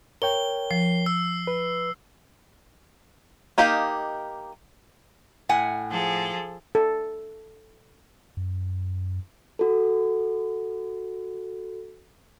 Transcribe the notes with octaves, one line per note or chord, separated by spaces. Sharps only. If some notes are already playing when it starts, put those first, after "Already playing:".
A#4 C#5 G5 G7
F3 C7
E6
B4
A#3 D#4 G4 D#5 F5
A2 F#5 G#5
F3 G#4 A4
A4
F#2
F#4 A4